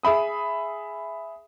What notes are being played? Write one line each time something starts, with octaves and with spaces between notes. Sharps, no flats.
G#4 E5 B5 D#6